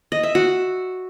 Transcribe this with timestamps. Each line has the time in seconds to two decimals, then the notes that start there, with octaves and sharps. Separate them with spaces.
0.12 D#5
0.23 E5
0.35 F#4